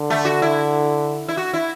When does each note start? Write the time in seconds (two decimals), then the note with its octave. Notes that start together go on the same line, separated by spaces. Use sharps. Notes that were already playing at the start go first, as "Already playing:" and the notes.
Already playing: D3
0.10 A3
0.25 F#4
0.42 E4
1.28 E4
1.37 F#4
1.54 E4